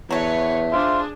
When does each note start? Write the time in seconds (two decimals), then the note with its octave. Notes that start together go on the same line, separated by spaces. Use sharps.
0.11 E2 F#3 A3 B4 C#5
0.71 D4 F4 G#4 C5 E5